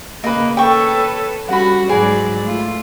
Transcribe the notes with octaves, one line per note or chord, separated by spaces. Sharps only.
C#3 A#3 B4 D#5
A4 B4 C#5 G5 C#6
G3 C#4 F#4 F#5 B5
G#2 F#3 G#4 B4 D5
A3 F4